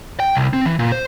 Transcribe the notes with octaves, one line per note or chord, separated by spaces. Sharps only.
G5
C2
C4
E3
A#2
C5